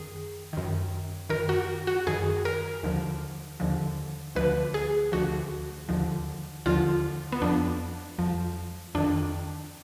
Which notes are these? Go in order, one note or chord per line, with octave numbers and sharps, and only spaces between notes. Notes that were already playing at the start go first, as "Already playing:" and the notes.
Already playing: F#2 D#3 G#4
F#2 D#3
F#2 D#3 A#4
F#4
F#4
F#2 D#3 G#4
A#4
D#2 D3 F3
D#2 D3 F3
D2 D3 F3 B4
G#4
D2 D3 F3 F#4
D#2 D3 F3
D#2 D3 F3 F4
B3
F2 F3 D4
F2 F3
F2 D#3 D4